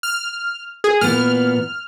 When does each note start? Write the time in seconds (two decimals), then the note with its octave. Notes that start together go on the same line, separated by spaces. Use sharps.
0.03 F6
0.84 G#4
1.01 A#2 E3 B3 F6